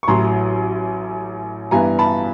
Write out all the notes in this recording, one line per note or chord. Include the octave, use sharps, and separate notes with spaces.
C#6
A1 A2 F#3 A#5 C6
G2 E3 G3 B3 G#5 A#5
A5 B5